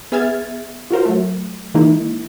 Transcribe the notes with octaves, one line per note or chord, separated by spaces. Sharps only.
B3 G#4 E5 F6 G#6 A6
F4 F#4 A#4 C5
F#3 A3
D#3 E3 G#3 A#3 D#4 E4